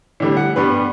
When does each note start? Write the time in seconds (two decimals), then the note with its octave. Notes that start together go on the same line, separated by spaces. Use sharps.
0.20 A2 D3 G3
0.37 F#5
0.56 G2 G3 B3 B4